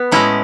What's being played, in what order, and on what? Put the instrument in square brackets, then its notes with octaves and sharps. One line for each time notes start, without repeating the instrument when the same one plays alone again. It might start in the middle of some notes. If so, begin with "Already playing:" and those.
Already playing: [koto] B3
A2 G#3 C#4 E4